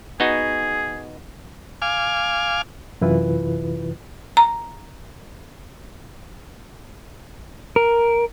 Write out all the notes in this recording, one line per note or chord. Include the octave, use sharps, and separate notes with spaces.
B3 D#4 F#4 G#4
F5 G#5 D6 F6
F#2 C3 E3 E4 F4 B4
A#5
A#4